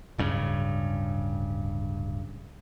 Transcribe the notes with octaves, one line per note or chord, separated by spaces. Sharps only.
D1 G2 C#3